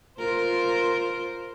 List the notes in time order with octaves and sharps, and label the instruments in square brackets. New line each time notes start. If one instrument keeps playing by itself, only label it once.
[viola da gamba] F4 A#4 C5